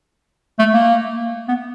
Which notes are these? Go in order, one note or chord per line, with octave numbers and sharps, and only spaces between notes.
A3
A#3
B3